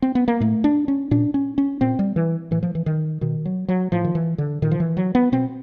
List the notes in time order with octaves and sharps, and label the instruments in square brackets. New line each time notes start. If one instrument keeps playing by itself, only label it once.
[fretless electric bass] C4
B3
A#3
A2 A3
D4
C#4
A#2 D4
C#4
C#4
A#2 C4
G3
E3
A2 E3
F3
E3
D#3
B2 D#3
F#3
F#3
A2 F3
D#3
E3
D3
A#2 D#3
F3
E3
F#3
B3
B2 C4